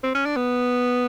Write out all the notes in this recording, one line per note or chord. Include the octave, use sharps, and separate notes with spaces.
C4
C#4
D4
B3